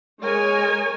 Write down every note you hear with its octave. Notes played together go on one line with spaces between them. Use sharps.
G#3 A#4 C#5 G#5